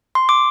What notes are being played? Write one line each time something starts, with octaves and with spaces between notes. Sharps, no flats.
C6
D6